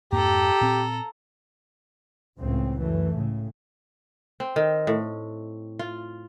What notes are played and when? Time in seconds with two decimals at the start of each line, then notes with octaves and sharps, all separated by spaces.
0.12 F2 G#2 A#3 G4 A4 A#5
0.61 A#2 C4
2.38 C#2 A2 C#3 C4
2.80 F#2 E3 A3
3.14 A2 C#3
4.40 C4
4.56 D#3
4.87 A2
5.79 F4